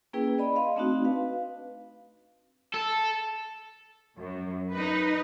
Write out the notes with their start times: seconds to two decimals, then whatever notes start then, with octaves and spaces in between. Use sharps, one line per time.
0.13 A#3 C#4 E4 G#4 B4 G5
0.38 D5 D#5 B5
0.56 D#5 F5 C6
0.76 A3 C4 D4 D#4 F#4
1.05 B4 F5
2.74 A4
4.17 F#2
4.75 D#4 B4